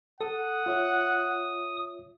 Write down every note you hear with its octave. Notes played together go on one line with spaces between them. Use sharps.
A4 F#5 D#6
F4 C#5 E5